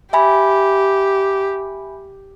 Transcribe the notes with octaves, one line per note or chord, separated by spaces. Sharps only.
G4 E5 G#5 B5